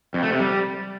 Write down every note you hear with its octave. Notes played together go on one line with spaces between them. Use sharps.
F2
A3
C3
G3